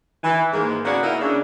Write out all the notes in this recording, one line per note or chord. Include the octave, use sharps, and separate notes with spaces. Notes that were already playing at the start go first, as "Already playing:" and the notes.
E3
G#2 D#3 G#3 A#3
C#3 A#3 B3 F#4 D5 F#5
A#3 D#4 E4 A#4
C#3 D4